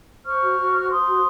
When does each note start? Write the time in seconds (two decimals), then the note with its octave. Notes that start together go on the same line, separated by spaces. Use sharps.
0.25 C5 C#6 F6
0.42 F#4
0.58 F#4
0.73 C5
0.90 C5 C6 D#6
1.06 F#4